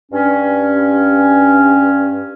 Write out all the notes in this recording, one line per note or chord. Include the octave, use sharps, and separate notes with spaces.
G2 C#4